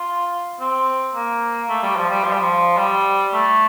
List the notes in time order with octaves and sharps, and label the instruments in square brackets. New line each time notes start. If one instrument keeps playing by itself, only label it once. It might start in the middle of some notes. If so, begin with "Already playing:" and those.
Already playing: [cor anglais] F4
C4
A#3
A3
G3
F3
G3
F3
G3
F3
G3
A3